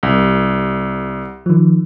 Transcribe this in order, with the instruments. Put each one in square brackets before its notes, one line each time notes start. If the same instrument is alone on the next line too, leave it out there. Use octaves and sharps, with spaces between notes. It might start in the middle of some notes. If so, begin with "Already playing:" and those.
[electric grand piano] C2
[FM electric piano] D#3 F3